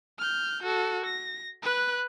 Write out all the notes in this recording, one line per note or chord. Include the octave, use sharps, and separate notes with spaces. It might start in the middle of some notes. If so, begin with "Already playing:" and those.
F6 G6
F#4 A4
A#6
B4 F#6